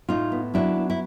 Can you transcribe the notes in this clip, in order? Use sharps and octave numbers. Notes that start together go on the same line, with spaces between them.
A2 D#4 F4
B3
F#3 D4 E4
B3
E4